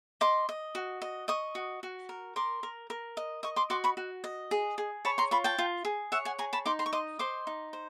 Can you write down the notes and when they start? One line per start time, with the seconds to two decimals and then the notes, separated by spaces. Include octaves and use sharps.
0.21 D#5 C6 D6
0.49 D#5
0.75 F#4
1.02 D#5
1.28 D#5 C#6 D#6
1.55 F#4
1.83 F#4
2.09 A#4
2.36 A#4 C6 D6
2.63 A#4
2.90 A#4
3.17 D#5
3.43 D#5 C#6 D#6
3.56 C6 D6
3.70 F#4 C6 D6
3.84 B5 C#6
3.97 F#4
4.24 D#5
4.51 G#4
4.78 G#4
5.05 C#5 A5 B5
5.18 A#5 C6
5.31 F4 B5 C#6
5.44 G5 A5
5.58 F4
5.85 G#4
6.12 C#5 E5 F#5
6.25 F#5 G#5
6.39 G#4 G#5 A#5
6.53 A5 B5
6.66 D#4 C6 D6
6.79 A#5 C6
6.86 C#6
6.93 D#5 C6 D6
7.19 C5 C6 D6
7.47 D#4
7.73 C5